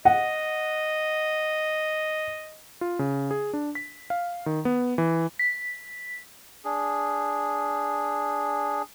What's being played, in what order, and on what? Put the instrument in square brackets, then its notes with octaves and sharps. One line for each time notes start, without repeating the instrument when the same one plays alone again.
[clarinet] D#5 [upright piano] F#5
[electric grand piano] F4
C#3
G#4
D4
B6
F5
D#3
B3
E3
[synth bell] B6
[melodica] D4 G#4